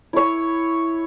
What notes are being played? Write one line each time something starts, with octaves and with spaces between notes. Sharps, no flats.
E4 C#5